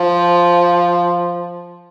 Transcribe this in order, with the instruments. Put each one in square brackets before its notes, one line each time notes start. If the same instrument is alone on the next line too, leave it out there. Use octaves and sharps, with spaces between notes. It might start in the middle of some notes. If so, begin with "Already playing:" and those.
Already playing: [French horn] F3